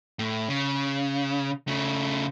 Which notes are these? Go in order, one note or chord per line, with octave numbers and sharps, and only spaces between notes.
A2
C#3
C#3 A3